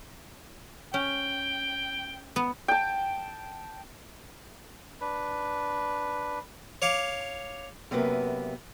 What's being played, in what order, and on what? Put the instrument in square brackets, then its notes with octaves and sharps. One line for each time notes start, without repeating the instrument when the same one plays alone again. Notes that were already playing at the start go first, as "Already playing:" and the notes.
[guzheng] C#4 [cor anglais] G5
[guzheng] B3
[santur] G5 A5
[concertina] D4 B4
[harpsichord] C#5 F5 D6
[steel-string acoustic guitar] F#2 C3 A#3 B3 B4